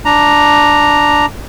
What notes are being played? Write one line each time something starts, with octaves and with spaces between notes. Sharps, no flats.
D4 A#5